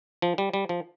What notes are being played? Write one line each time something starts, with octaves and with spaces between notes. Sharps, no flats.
F3
G3
G3
F3